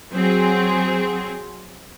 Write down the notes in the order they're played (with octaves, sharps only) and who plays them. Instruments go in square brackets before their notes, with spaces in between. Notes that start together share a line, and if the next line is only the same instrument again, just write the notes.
[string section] F#3 C4 G#4